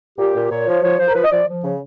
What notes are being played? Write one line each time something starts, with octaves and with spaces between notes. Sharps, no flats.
A#2 G4
A#2
A#2 C#5
F3
F3 C#5
F3 C5
A#4
F3 B4
D#5
F3 D5
F3
C#3